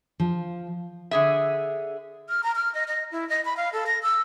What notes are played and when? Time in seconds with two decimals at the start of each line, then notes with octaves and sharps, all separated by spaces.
0.20 F3
1.11 D3 G#4 E5
2.29 F6
2.43 A#5
2.55 F6
2.74 D#5
2.88 D#5
3.11 E4
3.29 D#5
3.45 B5
3.57 F5
3.73 A4
3.86 A#6
4.02 E6